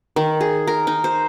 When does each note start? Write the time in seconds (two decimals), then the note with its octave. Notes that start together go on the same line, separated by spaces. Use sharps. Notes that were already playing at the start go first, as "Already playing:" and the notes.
0.16 D#3
0.41 G#4
0.67 A#4
0.87 D#4
1.04 C5